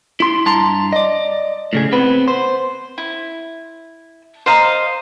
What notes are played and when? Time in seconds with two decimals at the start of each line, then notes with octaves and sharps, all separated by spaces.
0.20 E4 C6
0.46 G2 A5 A#5 C6
0.93 D5 D#5
1.73 A2 C#3 G#4
1.92 B3 C4 B4
2.28 C5
2.98 E4
4.46 C5 D#5 F5 A#5